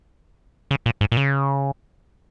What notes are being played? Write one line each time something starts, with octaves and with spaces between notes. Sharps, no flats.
C#3
A#2
G#2
A#2
C#3